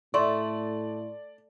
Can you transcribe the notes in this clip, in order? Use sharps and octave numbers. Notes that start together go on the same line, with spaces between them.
A2 A3 D5 C6 C#6